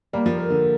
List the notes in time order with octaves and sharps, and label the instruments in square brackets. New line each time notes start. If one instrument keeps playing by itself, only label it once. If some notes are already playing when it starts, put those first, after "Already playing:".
[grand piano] G3 [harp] A#3
[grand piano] F3
[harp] A#4
[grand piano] D3